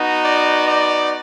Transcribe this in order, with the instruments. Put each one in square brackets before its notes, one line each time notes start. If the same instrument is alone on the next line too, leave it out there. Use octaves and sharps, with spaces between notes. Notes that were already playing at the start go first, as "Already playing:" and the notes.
Already playing: [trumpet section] B3 D#4 F#4
D5
D5